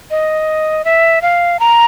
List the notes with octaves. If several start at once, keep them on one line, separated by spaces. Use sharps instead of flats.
D#5
E5
F5
A#5